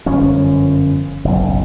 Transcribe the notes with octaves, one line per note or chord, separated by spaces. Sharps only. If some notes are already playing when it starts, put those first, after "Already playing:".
G1 F#2 F3 C#4
F#1 B1